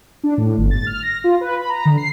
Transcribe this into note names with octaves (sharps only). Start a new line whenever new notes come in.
D4
A2
G1
A6
F6
A#6
F4
B4
B5
A#5
D3
C7